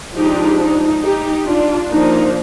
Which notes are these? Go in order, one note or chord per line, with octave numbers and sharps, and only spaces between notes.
F3 G#3 D4 D#4 G4
D#4
D#4 G4
D4 F4
F3 A#3 D4 D#4